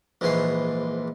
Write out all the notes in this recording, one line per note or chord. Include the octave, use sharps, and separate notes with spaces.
A#1 G#2 E3 C6